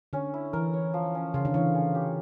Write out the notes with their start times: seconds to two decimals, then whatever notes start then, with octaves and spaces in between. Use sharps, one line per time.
0.13 D3 C#4
0.34 E4
0.53 E3 A#4
0.73 C#5
0.94 F3
1.15 C#4
1.34 C#3 F4
1.45 D3
1.54 E3 C#5
1.75 C#4
1.95 G4